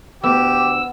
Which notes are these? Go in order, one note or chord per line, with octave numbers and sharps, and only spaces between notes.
D2 B3 G4 E6